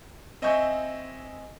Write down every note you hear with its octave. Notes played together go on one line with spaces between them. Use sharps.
C4 D#5 E5 G#5 C#6 G6